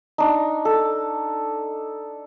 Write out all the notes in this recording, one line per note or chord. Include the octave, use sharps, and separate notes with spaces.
D4 D#4
A4